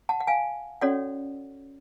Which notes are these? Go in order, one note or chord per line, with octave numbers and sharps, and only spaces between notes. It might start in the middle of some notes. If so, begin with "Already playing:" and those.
F#5 A5
F#5
F5 G#5
C#4 F#4 A4 C#5 D5 F#5